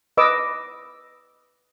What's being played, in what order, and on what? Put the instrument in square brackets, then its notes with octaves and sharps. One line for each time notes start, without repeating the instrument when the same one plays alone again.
[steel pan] B4 D#5 D6 E6